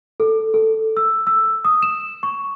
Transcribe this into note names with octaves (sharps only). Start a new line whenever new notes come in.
A4
A4
E6
E6
D#6
E7
C#6